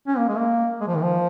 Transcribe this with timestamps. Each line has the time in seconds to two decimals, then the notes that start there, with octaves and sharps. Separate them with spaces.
0.08 C#4
0.18 A#3
0.29 G#3
0.39 A#3
0.81 G#3
0.88 F3
0.95 D#3
1.03 F3